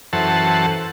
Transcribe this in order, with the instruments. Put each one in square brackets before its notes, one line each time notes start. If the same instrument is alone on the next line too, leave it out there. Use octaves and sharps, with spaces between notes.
[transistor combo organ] F#2 E3 A4 C5 F#5 A5